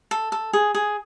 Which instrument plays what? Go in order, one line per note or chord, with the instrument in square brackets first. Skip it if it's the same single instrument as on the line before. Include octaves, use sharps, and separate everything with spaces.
[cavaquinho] A4
A4
G#4
G#4